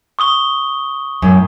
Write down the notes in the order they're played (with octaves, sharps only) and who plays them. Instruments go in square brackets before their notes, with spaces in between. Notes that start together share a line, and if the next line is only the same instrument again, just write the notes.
[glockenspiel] C#6 D#6 G7
[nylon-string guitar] F#2 A2